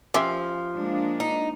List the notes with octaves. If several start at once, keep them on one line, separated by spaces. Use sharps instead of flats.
F3 C#4 G4 E5
G#3 A#3 D4
D#4